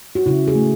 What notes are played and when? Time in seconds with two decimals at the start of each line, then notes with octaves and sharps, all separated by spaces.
0.15 F#4
0.26 C#3 E4
0.48 G#4
0.55 A3